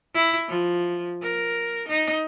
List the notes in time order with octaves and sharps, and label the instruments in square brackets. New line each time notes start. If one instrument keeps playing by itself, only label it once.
[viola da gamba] E4
F3
A#4
D#4